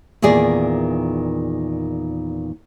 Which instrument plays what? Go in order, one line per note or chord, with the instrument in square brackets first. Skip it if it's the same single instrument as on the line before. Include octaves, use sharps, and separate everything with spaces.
[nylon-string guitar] E2 A#2 D#3 G#4 D5